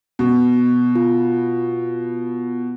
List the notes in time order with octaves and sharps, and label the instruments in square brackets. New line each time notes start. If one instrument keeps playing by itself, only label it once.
[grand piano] B2
[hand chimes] F4